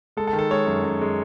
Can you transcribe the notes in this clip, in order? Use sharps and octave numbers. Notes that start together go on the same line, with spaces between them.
G#3 A4
A4
D#3
A4
G#3 C#5
F#2
F#2
G#3